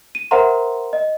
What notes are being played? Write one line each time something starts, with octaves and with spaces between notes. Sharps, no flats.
D#7
A#4 C5 E5 F#5 A#5 C6
D#5